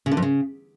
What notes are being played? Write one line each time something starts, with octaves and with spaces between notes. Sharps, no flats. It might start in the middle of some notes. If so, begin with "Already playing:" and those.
C#3
D3
F2
C#3